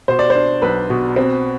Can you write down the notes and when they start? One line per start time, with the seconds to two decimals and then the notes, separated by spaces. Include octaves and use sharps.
0.08 B2 C5
0.19 D5
0.30 C5
0.35 D4
0.62 B1 B4
0.90 B2
1.16 C4